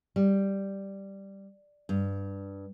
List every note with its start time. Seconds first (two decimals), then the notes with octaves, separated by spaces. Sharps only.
0.16 G3
1.89 G2